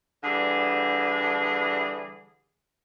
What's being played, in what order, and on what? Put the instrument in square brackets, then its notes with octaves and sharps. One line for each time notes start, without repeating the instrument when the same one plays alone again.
[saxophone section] D3 E3 G3 G#4